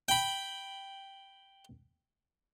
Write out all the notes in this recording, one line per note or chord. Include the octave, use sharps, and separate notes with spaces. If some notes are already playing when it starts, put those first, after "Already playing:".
G5 B5